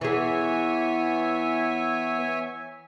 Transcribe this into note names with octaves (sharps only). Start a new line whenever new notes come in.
E3 B3 G#4 C#5 E5 G#5